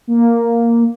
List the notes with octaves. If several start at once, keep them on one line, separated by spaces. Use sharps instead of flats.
A#3